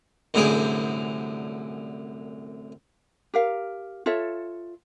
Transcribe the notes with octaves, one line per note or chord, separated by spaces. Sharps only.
C2 F#2 A2 D3 G#4 G5
G4 A#4 F5
F4 A4 C#5 E5